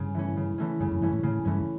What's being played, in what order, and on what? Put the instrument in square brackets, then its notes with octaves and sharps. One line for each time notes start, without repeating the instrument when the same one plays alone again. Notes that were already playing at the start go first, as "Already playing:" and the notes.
Already playing: [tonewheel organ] G2 [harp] C#3
[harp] E3 A3 C#4
C#3
E3 A3 C#4
[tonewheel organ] G2 [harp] C#3
[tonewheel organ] F#2
[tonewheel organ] G2 [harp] E3 A3 C#4
[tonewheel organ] A2
[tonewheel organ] A2 [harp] C#3
[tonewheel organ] G2 [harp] E3 A3 C#4